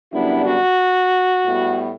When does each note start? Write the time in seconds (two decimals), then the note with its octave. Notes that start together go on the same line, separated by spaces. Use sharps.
0.11 F#2 D3 G3 B3 D4 E4
0.44 F#4
1.43 A2 G3 B3